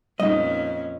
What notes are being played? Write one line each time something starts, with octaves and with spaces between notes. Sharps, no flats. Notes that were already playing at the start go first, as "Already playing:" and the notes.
F2 A#2 G3 G#3 C#4 D#4 D#5